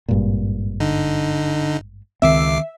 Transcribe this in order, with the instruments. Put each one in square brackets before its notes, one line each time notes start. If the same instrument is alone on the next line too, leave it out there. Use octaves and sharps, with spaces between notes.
[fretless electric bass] G#1 G2 A#2
[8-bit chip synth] D3 D#4
[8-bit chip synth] C#2 D6 C7 [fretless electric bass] D#3 C4 [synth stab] E5